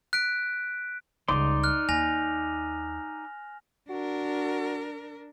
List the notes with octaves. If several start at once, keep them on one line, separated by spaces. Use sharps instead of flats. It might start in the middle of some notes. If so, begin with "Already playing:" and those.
F#6 B6 D7
C#2 G3 D#4 D5 C6
F6 F#6
D#2 G#5 A#6 F7
D4 F#4 A#4